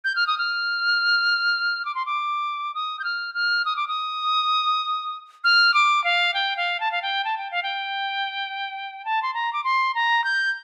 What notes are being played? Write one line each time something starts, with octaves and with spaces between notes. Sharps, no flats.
G6
F6
D#6
F6
D6
C6
D6
D#6
G6
F6
F6
D#6
D6
D#6
F6
D6
F5
G5
F5
A5
F5
G5
A5
G5
F5
G5
A5
C6
A#5
D6
C6
A#5
G6